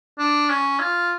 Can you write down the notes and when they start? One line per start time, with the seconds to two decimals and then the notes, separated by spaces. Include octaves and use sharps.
0.18 D4
0.49 C#4
0.80 F4